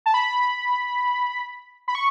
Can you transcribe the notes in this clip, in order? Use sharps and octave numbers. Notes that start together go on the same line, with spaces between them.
A5
B5
B5
C#6